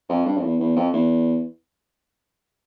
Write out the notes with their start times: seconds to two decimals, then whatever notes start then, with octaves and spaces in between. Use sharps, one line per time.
0.09 F2
0.26 G2
0.37 F2
0.43 E2
0.60 E2
0.76 F2
0.93 E2